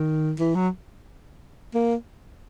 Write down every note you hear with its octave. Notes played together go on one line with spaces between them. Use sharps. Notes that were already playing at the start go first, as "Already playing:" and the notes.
Already playing: D#3
E3
F#3
A#3